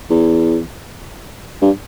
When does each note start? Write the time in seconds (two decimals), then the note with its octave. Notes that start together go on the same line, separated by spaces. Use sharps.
0.10 E2
1.62 G2